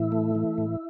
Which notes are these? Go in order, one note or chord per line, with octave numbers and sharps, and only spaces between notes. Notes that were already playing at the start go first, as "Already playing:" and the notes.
Already playing: A2 E3 E4
A3
E3
A2